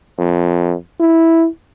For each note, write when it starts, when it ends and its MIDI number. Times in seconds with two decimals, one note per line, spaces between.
0.18 0.75 41
1.00 1.47 64